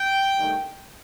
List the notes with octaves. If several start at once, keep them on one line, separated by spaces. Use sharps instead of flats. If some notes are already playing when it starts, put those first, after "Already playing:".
Already playing: G5
G2 D#3 A3 D#4